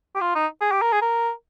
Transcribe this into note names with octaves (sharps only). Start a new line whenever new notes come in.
G4
F4
D#4
G#4
G4
A#4
G#4
A#4